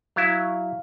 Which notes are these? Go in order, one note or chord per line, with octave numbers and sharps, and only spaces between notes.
F#3 E4 E5 F5